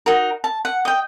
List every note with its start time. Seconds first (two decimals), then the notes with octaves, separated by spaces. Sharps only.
0.06 D#4 F#4 A#4
0.44 A5
0.65 F#5
0.85 D#5 G5